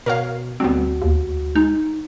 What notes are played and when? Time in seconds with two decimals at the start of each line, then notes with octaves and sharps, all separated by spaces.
0.06 B2 A#4 C#5 F5
0.60 D2 D3 G3 B3 C4 F#4
1.02 D#2
1.56 G#3 D#4